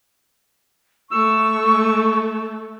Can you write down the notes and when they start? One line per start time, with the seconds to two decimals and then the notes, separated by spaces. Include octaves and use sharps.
1.12 A3 C#6 E6